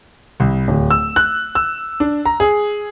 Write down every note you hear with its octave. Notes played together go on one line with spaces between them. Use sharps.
C2
D1
E6
F#6
E6
D4
A#5
G#4